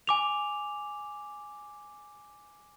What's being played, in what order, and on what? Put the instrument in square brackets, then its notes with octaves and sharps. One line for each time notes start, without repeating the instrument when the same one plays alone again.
[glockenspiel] G#5 D6 F7